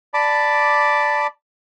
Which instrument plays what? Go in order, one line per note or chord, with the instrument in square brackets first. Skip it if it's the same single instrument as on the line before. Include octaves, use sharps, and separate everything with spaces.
[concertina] D5 A5 B5 D6